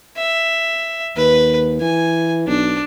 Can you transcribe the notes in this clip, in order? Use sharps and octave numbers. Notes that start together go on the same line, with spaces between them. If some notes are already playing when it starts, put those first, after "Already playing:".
E5
D#2 B4
E3 G#5
B1 D4